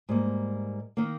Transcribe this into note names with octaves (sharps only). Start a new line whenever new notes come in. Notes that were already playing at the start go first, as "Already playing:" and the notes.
G#2 G3 A#3
D#3 A#3